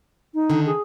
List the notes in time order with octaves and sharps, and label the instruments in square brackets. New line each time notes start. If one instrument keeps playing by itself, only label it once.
[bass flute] D#4
[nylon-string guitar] D3 D#3
[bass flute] G#4